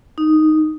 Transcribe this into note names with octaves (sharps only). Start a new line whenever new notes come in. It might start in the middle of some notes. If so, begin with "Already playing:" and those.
D#4